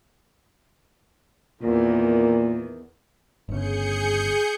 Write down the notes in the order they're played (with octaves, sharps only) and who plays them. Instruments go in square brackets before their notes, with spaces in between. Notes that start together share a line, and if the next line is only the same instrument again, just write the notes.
[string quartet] E2 D#3 [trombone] A#2
[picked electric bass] G1 C#3 [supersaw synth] G#4 G6 C#7